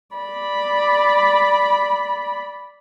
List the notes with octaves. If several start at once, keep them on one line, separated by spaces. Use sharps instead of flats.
D5 B5